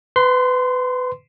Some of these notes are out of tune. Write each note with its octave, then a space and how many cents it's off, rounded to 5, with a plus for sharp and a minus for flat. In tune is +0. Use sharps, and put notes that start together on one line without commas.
B4 +25 C6 -15